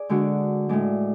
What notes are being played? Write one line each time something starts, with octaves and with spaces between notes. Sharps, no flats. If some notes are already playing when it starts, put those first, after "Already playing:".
Already playing: G#4 D5
D3 G#3 D4 F#4
A2 G#3 D4